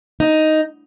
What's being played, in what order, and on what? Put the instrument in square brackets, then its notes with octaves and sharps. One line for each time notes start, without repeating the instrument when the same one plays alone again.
[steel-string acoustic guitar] D#4